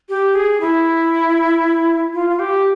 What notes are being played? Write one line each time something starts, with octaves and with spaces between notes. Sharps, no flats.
G4
G#4
E4
F4
F4
G4